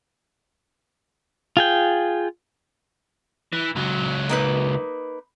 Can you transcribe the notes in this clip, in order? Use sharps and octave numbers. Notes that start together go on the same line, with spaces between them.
F4 G#4 G5
E3
C#2 F#3
A#3 D#4 B4